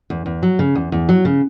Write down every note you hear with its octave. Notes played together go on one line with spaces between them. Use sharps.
E2
E2
F#3
C#3
E2
E2
F#3
C#3